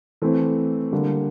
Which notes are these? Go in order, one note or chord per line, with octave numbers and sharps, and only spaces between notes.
E3 A3 C4
D3 G3 A#3